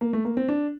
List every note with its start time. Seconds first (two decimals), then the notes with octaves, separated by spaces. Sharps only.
0.01 A#3
0.13 A3
0.25 A#3
0.37 C4
0.48 D4